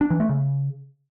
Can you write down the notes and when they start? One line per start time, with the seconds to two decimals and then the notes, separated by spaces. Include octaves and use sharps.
0.01 D4
0.10 E3
0.20 A3
0.29 C#3